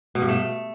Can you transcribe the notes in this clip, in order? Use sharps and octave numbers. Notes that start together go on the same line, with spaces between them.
B2
G2
A3